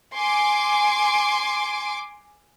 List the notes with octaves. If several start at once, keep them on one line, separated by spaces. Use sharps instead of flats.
G#5 C6 D6